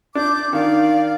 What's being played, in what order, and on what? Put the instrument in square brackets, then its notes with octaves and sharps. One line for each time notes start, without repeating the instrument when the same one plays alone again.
[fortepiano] D4 [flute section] D6 G6
[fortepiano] D#3 [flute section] D5 F5